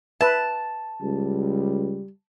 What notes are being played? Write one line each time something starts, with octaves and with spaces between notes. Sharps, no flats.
B4 E5 A5
C#2 G3